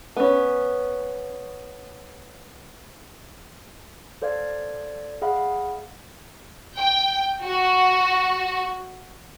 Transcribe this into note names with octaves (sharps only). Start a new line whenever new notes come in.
B3 C#4
A4 C5 D5 F5 G#6
G#4 D#5 F5 F#5 B5
G5
F#4